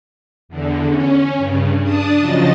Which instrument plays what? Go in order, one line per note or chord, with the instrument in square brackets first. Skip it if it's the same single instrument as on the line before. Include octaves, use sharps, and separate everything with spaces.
[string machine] E2 D3
C#4
G2 C#3
D4 A5 D#6
C#3 F3 F#3 D#5 A6